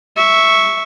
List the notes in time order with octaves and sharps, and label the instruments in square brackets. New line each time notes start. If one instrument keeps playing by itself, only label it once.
[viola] E5 C#6